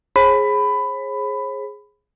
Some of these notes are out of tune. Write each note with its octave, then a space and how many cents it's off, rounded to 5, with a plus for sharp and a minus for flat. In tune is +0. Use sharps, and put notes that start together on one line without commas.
G#4 +0 C5 +45 B5 +15